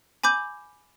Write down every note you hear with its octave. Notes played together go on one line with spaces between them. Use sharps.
G#5 B5 D6 G6